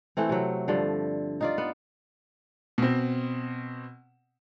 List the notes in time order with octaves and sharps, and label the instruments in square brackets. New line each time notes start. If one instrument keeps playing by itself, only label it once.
[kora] E3 A3 C4
C3 F#3
G2 D3 F3
D#4 F4 D5
B3
[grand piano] B2 C4